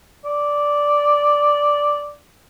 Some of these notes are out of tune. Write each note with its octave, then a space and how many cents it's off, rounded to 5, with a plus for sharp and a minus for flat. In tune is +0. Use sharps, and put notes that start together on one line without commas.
D5 -5